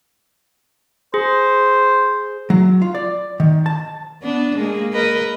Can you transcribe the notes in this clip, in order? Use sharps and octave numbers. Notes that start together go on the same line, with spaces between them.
G#4 C5
F#3
F4
D5
D#3
A5
B3 D4
G#3 A#3 G#4
A#4 B4 D#5